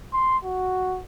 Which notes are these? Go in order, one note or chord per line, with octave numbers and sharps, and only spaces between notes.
C6
F#4